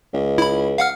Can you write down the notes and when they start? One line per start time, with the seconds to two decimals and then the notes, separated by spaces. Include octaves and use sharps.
0.13 C#2
0.38 E4 B5
0.78 F5 F#5 F6